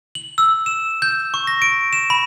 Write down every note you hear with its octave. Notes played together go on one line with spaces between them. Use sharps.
F#7
E6
E7
G6
C#6
A#6
D7
E7
B5